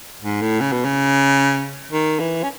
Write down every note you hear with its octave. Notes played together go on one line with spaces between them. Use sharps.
G#2
A2
C#3
B2
C#3
D#3
E3
C#4